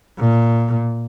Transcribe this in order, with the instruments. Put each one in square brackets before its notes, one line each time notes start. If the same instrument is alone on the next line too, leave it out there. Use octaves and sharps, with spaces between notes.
[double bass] A#2